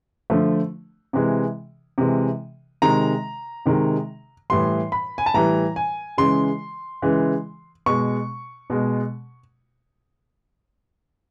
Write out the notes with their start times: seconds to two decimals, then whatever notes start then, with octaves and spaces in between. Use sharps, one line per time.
0.30 D3 F3 A3
1.13 C3 E3 G#3
1.98 C3 E3 G#3
2.82 C3 D#3 G#3 A#5
3.66 C3 D#3 G#3
4.50 A2 E3 G3 C6
4.92 B5
5.18 G#5
5.26 A5
5.34 A2 E3 G3 A#5
5.76 G#5
6.18 C#3 E3 G#3 C6
7.02 C#3 E3 G#3
7.86 B2 G#3 C#6
8.70 B2 G#3